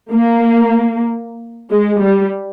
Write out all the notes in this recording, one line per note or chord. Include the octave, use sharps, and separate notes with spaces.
A#3
G#3
G3